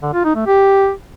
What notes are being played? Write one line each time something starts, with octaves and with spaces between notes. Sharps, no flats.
D3
F4
D#4
A3
G4